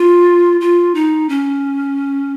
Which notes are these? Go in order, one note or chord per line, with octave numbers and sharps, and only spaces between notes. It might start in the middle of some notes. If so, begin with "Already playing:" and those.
Already playing: F4
F4
D#4
C#4